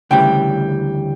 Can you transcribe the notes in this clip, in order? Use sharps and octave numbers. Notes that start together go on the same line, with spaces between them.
D2 C#3 E3 G3 G5